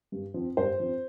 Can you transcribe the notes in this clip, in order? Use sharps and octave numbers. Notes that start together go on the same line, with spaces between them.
G2
F3 C4
G2 C5
F3 C4